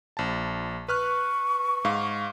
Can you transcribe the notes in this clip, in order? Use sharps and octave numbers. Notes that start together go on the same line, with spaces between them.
A#1 A5
B4 C#6 F6 F#6
G#2 F5